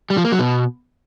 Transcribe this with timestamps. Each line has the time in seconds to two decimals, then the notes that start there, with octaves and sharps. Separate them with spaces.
0.10 G3
0.17 F3
0.25 A#3
0.32 F#3
0.39 B2